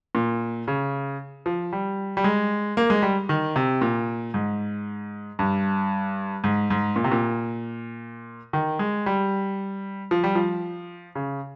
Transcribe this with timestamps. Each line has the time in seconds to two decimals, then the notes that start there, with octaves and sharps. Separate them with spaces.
0.15 A#2
0.68 C#3
1.46 F3
1.73 G3
2.17 G3
2.24 G#3
2.77 A#3
2.90 G#3
3.02 G3
3.29 D#3
3.56 C3
3.82 A#2
4.34 G#2
5.39 G2
6.44 G#2
6.70 G#2
6.96 A#2
7.04 C3
7.11 A#2
8.53 D#3
8.79 G#3
9.06 G3
10.11 F3
10.24 G3
10.35 F3
11.15 C#3